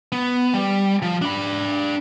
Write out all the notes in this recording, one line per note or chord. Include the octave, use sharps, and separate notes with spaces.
B3
G3
F3
D4 B5